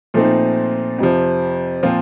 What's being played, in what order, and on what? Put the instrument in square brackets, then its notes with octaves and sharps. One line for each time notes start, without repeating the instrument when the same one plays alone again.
[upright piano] A#2 F3 A3 C4 D#4
F2 C3 F3
A#2 F3 C4 F4